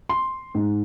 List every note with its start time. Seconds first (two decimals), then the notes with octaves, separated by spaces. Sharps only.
0.09 C6
0.55 G#2